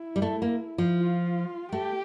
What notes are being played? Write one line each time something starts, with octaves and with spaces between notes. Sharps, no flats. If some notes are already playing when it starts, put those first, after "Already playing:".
Already playing: E4
G3
A3
A#3
F3
F4
A3 G4